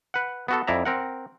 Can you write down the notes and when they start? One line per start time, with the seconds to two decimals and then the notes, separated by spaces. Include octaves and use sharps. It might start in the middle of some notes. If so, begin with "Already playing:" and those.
0.14 B4 F#5
0.48 B3 F#4 A4
0.67 F2 E4 D5 E5 A#5
0.85 C4 A#4 F#5